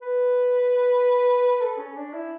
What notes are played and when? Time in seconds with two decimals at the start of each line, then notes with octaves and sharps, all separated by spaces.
0.02 B4
1.61 A4
1.78 C#4
1.97 D4
2.13 E4